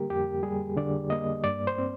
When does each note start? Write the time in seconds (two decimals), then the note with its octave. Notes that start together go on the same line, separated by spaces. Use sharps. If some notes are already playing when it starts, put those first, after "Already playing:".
Already playing: D3 G3 A#3 G4 A#4
0.10 F2 G4
0.43 G3 G#4
0.77 D3 D5
1.10 A#3 D#5
1.44 G2 D5
1.67 C5
1.78 C4